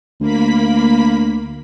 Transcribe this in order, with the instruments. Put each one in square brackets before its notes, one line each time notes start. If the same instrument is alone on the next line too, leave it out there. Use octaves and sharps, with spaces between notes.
[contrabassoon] D2 [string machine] A#3 B5 B6